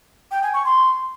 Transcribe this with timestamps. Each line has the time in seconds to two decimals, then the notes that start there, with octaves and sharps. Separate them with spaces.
0.31 G5
0.43 G#5
0.54 C#6
0.65 C6